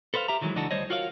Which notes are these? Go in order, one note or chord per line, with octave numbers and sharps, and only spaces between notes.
A4 B4 C5 E5 F5
G4 E5 A#5
D#3 E3 F#3 G#3
C#2 E3 D4 D#4 F#4 A4
D2 G3 C5 C#5 D#5
F4 F#4 A#4 C#5 D5 F5